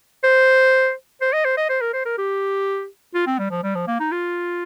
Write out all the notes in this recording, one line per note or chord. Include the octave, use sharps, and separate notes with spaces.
C5
C5
D#5
C5
D#5
C5
A#4
C5
A#4
G4
F4
C4
G3
F3
G3
F3
A#3
D#4
F4